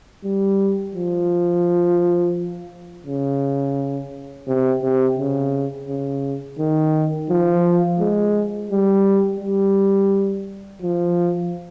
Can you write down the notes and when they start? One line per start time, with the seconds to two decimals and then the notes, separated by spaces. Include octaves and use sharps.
0.24 G3
0.95 F3
3.06 C#3
4.47 C3
4.82 C3
5.18 C#3
5.88 C#3
6.59 D#3
7.30 F3
8.00 G#3
8.71 G3
9.40 G3
10.82 F3